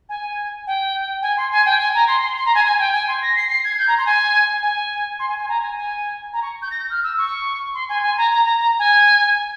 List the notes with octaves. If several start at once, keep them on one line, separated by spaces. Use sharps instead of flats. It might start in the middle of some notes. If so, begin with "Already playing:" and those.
G#5
G5
G#5
C6
G#5
G5
G#5
A#5
C6
C6
C6
A#5
G#5
G#5
G5
G#5
C6
A#6
C7
C7
G#6
G6
A#5
C6
G#5
G#5
C6
G#5
G#5
A#5
G#5
G#5
A#5
C#6
G6
A#6
G6
F6
E6
C#6
C6
G#5
G#5
A#5
A#5
A#5
A#5
G#5